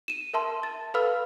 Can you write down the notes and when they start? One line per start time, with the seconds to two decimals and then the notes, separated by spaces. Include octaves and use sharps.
0.08 D#7 E7
0.34 A#4 E5 A5 C6
0.63 A6
0.94 A4 B4 F5 B5 E6 F6